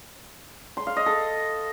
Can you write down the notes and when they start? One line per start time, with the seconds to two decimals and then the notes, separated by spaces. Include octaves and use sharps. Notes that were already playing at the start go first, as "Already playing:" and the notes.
0.77 C6
0.87 F5
0.96 D#5
1.06 A4